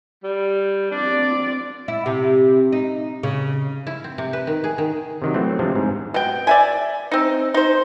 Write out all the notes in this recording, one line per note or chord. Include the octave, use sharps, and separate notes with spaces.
G3
C4 D4 D5
E4
C3
D#4
C#3
E4
C4
C3
B4
D#3
G#4
D#3
C3 D#3 F#3
E3 F#3 A3 C4
C3 F3 G3 G#3 C4 D4
G#2
B2 G5
D5 E5 G#5
C4 D#4
D#4 C5